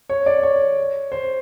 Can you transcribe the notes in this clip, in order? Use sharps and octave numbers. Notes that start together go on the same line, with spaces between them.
C#5
D5
C#5
C5